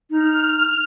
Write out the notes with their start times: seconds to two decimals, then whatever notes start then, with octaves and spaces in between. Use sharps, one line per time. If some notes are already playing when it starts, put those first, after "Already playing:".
0.10 D#4 F6